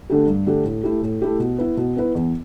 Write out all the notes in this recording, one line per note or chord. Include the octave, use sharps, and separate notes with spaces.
D3 A3 D4 G4
G2
D3 A3 D4 G4
A2
A3 E4 G4
A2
A3 E4 G4
B2
B3 E4 B4
B2
B3 E4 B4
E2